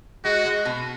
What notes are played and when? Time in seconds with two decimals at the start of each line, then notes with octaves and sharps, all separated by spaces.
0.25 G#3 F#4
0.45 G#3
0.65 B2